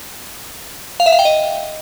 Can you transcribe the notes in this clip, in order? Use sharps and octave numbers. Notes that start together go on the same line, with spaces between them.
F5
E5
F5
G5
D#5